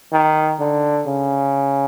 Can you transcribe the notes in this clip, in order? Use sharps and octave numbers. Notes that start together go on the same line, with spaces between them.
D#3
D3
C#3